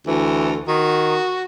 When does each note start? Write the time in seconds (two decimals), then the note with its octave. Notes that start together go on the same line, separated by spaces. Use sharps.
0.07 D2 E3
0.68 D#3 F#4